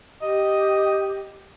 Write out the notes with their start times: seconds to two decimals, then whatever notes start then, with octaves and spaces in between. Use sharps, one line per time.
0.22 G4 D#5